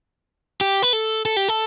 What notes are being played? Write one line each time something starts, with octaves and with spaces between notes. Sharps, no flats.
G4
B4
A4
A4
G4
A4